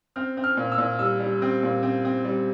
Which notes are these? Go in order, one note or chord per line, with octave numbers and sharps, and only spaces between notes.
C4 F6
C4
F6
A#2
E6
A#2
G3 E6
G3
C4
A#2
C4
C4
G3